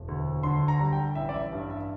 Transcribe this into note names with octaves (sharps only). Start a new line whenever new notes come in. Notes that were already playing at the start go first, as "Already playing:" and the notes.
Already playing: E1
D2
D3 C6
A#5
G3
G5
A1 E5
D5
E5
G2
E5